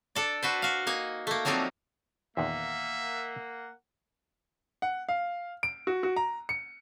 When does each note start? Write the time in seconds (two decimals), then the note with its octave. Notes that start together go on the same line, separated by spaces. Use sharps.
0.15 D4 A4 D5
0.43 F#4 B4 C5
0.62 F#4 F5
0.87 A#3 D#4 G#5
1.27 A3 A#3
1.45 F3 F#3 C4 D4 D#4
2.37 E2 A#2 D#3 A#3 E5 F#5
4.82 F#5
5.09 F5
5.63 D7
5.87 F#4
6.03 F#4
6.16 A#5
6.49 C#7